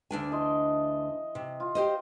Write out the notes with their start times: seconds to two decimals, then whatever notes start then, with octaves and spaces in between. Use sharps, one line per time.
0.11 D2 D4 G#5
0.31 E3 D#5 C6
1.35 C3
1.60 F4
1.75 G4 C5 D#5